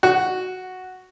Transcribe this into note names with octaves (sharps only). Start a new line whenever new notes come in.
F#4